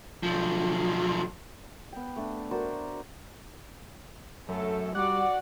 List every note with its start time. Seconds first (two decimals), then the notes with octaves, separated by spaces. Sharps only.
0.23 B1 F3
1.92 B3 G5
2.16 A3 D4
2.51 F#4 A#4 C5 D5
4.49 F#2 A3 A4
4.95 G3 F#4 D5 F#5 D6